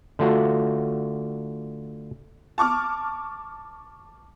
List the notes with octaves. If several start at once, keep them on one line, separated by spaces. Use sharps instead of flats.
D3 A3 F4 F#4
A5 C#6 D6 F6